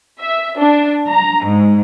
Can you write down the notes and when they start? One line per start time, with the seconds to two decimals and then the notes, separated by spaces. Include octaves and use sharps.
0.21 E5
0.59 D4
1.08 A#5
1.45 G#2